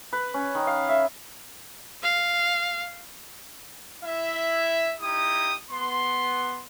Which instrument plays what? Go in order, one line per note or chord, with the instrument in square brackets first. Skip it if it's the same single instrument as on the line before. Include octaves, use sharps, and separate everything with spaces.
[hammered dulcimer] B4
C#4
D#3
F5
E5
[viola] F5
[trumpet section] E4 E5
D#4 E4 G4 D#6
B3 C6